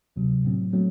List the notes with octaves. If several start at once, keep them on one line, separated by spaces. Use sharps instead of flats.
D2 C3 F#3
A2 F#3 C4
F#3 A3 C4